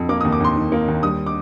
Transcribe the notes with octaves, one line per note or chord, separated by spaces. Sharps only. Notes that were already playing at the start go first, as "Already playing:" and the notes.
Already playing: F2
A#3 D6
D#6
D#2
D6
D#2 C6
D#3
A#3
D#2
G3 D#6
D6